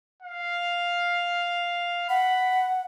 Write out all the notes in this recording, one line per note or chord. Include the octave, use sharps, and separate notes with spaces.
F5
F#5 B5